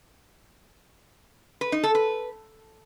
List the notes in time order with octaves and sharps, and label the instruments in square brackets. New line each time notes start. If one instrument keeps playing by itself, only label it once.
[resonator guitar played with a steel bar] B4
D#4
A4
B4